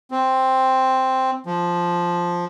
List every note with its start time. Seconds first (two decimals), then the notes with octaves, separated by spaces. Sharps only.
0.11 C4
1.46 F3